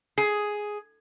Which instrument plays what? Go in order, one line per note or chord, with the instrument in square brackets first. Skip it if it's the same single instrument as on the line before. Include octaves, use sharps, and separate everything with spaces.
[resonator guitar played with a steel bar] G#4